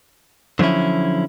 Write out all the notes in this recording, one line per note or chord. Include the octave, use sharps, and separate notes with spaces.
D3 F3 F#3 C#4 E4